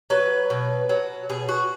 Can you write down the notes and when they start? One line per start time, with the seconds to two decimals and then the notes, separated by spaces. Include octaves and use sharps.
0.10 F#3 B4
0.50 B2
0.89 F#3
1.29 B2 G#4
1.49 F#4